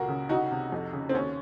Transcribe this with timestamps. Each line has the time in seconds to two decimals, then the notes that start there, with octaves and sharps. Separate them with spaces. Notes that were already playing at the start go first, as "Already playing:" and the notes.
Already playing: C#2 A#2 F#4 A#4
0.08 C#3
0.29 C2 D#4 F#4
0.51 C3
0.72 F2
0.93 C#3
1.09 C4
1.14 D#2 C#4